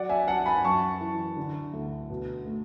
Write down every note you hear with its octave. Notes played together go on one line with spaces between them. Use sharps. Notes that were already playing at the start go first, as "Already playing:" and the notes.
Already playing: F#3 D5 F#5
E5 G#5
F#3 F#5 A5
G#5 B5
F#2 A5 C#6
E3
D3
D2
B2
A3